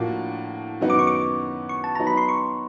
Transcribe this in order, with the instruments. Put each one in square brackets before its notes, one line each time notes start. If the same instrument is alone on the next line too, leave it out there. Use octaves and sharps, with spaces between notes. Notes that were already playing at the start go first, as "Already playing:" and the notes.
Already playing: [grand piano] A2 F3 A#3 D4 F#4
F#2 D#3 F#3 B3 D#4
[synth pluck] D6
C#6
D6
C#6
A5
[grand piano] F#3 B3 D#4 [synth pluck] A#5
[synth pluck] B5
C6
C#6